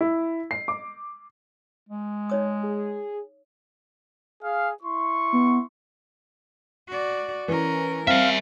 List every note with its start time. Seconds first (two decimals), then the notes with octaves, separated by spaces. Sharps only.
0.01 E4
0.51 C7
0.68 D6
1.89 G#3
2.30 D#4 C#5 D#6
2.64 G#4
4.43 G#4 F5
4.83 E4 C6 C#6
5.33 B3
6.89 F#4 D5
7.48 E3 C#4 A#4
8.07 G3 C4 A#4 E5 F5